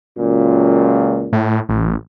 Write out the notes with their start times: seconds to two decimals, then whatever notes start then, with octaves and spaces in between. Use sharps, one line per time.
0.17 C#2 F#2 A#2
1.33 A2
1.69 A1